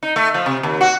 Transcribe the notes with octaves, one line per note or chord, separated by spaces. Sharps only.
D#4
A3
F3
C3
D#2
F#4